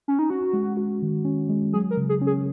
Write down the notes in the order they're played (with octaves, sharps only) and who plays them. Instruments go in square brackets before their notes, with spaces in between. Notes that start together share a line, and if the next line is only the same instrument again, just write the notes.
[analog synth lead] C#4
D#4
[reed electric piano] C#4 [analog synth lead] F#4
[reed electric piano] G#3
F#4
D#3
C#4
G#3
[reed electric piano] F#3 [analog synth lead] G#4
[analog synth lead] A#4
[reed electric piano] C#3
[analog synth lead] G#4
[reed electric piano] C#4
[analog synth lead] G#4